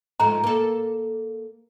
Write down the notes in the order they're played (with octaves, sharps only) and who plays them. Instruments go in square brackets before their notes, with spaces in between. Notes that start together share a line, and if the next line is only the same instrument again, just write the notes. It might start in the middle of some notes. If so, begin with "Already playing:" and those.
[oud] G#2 F3 A3 [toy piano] A#5
[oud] A#3 A4